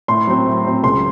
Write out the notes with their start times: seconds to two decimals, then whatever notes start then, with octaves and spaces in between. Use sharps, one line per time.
0.08 A2 C6
0.27 F#3 C4
0.46 A2
0.65 F#3 C4
0.83 C#2 C6